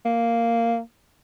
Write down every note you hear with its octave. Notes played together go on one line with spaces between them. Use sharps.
A#3